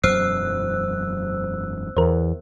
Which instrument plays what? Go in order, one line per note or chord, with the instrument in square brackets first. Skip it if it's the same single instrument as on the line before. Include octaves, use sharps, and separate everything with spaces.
[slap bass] E1 F#2 F#3 [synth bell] C5 E6 F#6 [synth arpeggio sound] C7
[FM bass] E2 [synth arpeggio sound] A#4 C5